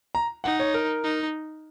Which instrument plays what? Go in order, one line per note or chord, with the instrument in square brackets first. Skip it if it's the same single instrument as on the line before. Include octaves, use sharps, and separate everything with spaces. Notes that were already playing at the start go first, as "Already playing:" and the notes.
[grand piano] A#5
[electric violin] D#4 [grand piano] F#5
[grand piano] C#5
A#4
[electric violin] D#4